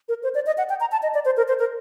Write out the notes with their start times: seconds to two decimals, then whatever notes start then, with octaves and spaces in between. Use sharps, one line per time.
0.09 A#4
0.23 C5
0.35 D5
0.46 D#5
0.58 F#5
0.69 G5
0.80 A#5
0.92 A5
1.03 D#5
1.14 D5
1.25 C5
1.37 A#4
1.48 C5
1.59 A#4